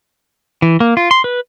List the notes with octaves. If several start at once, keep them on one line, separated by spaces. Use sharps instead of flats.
E3
A#3
F4
C6
B4